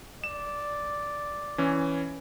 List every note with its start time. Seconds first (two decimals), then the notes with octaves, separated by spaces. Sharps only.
0.24 D5 E7
1.58 E3 C#4